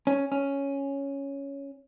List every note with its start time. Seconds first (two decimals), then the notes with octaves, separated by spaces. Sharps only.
0.07 C#4
0.32 C#4